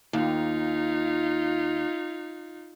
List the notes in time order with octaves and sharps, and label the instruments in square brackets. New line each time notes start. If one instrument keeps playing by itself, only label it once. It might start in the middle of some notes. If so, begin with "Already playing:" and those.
[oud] D#2 [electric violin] D#4 F4